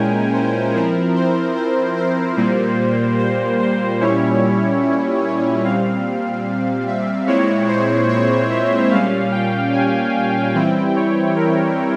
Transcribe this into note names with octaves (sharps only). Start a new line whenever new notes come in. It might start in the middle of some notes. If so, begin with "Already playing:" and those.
Already playing: A#2 G#3 C#4 E4 A#4 G5 G#5
C5
F3 C4 E4 A#4
C5
C5
C5
A#2 G3 A#3
C5
C5
A#2 G3 C#4 E4 C#5
C#5
A#2 G3 C4 F5
E5
A#2 G#3 C4 E4 C#5
C5
C#5
E5
A#2 G3 C#4 F5
G5
G#5
E3 G3 C4 E4 G5
C#5
A#4